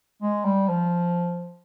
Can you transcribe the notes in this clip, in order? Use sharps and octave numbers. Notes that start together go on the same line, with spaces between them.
G#3
G3
F3